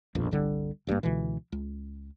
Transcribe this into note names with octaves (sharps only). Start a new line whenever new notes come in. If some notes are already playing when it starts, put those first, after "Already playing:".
D#1 A#1 F2 B2
G1 C2 D3 G3
G#1 G2 E3 A#3
C#2 B2 D3 E3
C#2